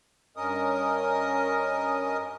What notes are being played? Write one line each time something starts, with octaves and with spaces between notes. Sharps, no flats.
G2 C#4 A#4 D#5 D#6